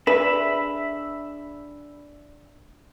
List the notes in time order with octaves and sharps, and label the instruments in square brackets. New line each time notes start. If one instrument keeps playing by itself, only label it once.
[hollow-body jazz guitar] D4 G#4 [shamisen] B4 [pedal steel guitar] E5 B5